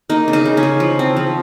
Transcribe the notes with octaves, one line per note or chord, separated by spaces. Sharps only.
A#3 D#4
C#3
D#4
C#3
C#4
C#3
F3
C4
F3